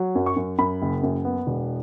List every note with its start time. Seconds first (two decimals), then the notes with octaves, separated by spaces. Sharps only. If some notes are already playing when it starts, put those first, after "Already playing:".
Already playing: F#3
0.15 F#2
0.26 C#6
0.36 F#2
0.58 F#2 B5
0.82 F#1
1.03 F#2
1.25 B3
1.47 E1